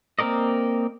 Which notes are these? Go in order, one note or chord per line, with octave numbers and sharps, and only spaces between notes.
A#3 C4 A#4 D5 D#5